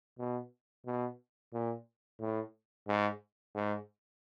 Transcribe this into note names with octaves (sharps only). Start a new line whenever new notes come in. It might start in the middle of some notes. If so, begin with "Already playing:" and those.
B2
B2
A#2
A2
G#2
G#2